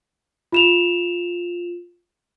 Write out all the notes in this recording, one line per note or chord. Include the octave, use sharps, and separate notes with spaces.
F4 E7 F7